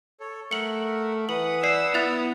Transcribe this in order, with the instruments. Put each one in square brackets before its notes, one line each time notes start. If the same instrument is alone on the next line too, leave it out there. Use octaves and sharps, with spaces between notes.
[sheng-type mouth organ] A4 C#5
[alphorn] A3 [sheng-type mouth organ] A#4 E5 F#5 [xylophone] C#7 F#7
[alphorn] E3 [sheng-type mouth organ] B4 F#5 D#6 [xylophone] F#7
[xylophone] D5 C7 [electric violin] E6
[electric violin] B3 [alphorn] E4 [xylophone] F#6 A6 F7